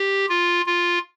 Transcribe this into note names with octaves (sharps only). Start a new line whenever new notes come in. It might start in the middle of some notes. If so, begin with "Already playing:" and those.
Already playing: G4
F4
F4